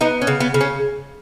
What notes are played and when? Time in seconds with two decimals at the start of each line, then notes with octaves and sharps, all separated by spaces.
0.01 B3 D#4
0.22 C#4
0.27 C#3
0.40 B3
0.54 C#3
0.61 C#4